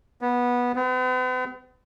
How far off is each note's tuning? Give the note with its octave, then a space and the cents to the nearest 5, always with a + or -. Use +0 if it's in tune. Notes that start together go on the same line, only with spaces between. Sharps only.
B3 -15
B3 +45